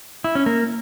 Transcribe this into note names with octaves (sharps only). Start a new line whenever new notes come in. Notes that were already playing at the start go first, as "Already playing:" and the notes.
E4
C#4
A#3